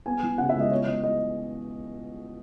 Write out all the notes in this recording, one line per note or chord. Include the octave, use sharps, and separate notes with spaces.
B3 G#5
E3
C#3 F#5
E5
C#2
D#5
B3 C#5
E3 D#5
D#5